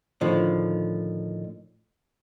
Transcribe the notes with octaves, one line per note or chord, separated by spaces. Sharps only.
A2 D3 D#3 F3